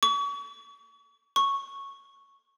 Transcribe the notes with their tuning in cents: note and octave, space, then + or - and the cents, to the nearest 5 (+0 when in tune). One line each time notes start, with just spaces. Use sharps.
C#6 +40
C#6 -5